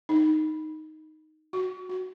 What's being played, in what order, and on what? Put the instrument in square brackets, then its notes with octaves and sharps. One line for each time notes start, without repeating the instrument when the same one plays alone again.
[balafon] D#4
F#4
F#4